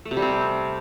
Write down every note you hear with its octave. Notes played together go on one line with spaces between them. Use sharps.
A3
C3
G3
C4